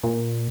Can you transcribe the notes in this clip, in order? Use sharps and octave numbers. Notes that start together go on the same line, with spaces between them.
A#2